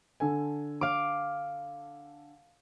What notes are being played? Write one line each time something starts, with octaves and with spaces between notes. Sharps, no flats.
D3 A4 G#5
F5 D6